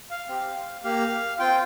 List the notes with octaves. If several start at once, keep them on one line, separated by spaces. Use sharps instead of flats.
F5
C4 G4
A#3 G4 F5
C4 F4 G5